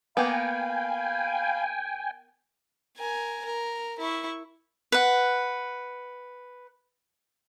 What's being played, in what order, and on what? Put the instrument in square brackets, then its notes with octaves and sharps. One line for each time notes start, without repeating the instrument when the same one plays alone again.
[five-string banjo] A#3 B3 [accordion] F5 B5 [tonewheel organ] G5 G#5
[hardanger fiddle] A#4 G#5
A#4
E4 C#6
[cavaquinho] B4 F#5